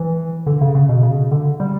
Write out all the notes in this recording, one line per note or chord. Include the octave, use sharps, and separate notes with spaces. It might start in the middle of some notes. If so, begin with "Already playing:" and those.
Already playing: E3
D3
C#3
C#3
B2
C#3
D3
G3